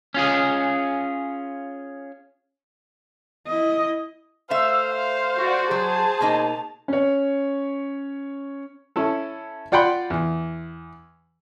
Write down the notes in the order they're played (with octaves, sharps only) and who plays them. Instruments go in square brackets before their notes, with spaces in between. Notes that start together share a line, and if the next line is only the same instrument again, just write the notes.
[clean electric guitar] C#4 F4 G#4
[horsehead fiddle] E4 D#5
[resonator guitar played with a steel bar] A3 A4 E5 [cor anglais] C5 [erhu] F5
[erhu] F5
[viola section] F#4 D5
[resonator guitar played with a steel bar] F#3 [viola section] G#4 [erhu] A5
[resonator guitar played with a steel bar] B2 A#3 D#4
[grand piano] C#4 C#5
[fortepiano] C#4 E4 A4
F4 D5 F#5 G5 B5 C6
E2